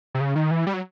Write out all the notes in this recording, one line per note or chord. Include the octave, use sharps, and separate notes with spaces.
C3
C#3
D#3
E3
G3
F#3